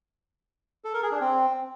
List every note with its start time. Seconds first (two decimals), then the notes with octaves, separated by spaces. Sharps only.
0.85 A4
0.94 A#4
1.02 G#4
1.11 D4
1.20 C4